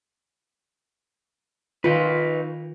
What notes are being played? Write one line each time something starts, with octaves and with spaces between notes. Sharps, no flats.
D#3 D#4 F4 B4